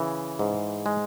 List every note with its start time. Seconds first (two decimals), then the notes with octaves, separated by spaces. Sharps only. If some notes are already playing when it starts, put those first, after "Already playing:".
Already playing: C#3 E3
0.39 G#2
0.86 G#3